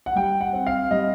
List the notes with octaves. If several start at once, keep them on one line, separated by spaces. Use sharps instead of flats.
F#5
G3 G5
F#5
C4
F5
G3 D#5